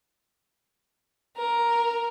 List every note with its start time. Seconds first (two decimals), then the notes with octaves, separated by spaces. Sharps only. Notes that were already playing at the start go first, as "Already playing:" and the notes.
1.36 A#4